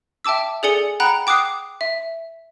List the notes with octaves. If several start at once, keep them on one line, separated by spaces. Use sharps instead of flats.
E5 G5 A5 D6 E6
G#4 A4 D5 G#5 C#7 G7
F#5 G5 A#5 B5 F#6
G5 D6 D#6 F#6 C7
E5